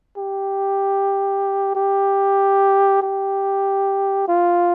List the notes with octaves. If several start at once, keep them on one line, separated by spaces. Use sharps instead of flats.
G4
G4
G4
F4